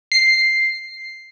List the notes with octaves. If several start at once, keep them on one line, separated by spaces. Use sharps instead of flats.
C7